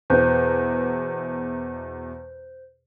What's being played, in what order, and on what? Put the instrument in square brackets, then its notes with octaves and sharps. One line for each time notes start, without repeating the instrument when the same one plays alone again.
[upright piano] E2 B2 [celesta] C5 F#6 G6